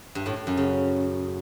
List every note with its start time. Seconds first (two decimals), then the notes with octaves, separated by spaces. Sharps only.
0.15 G2
0.26 A2
0.36 A2
0.47 F#2
0.57 C#3